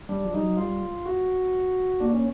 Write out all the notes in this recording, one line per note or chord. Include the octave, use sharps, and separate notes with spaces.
G3 D4
F3
G3 D#4
F#3
G3 F4
F#4
A#3 D4
C#4